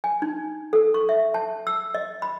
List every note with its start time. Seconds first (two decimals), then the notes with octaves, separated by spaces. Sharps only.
0.04 G#5
0.22 D#4
0.73 A4
0.94 C#6
1.09 E5
1.34 A5
1.67 E6
1.94 D#5
2.22 B5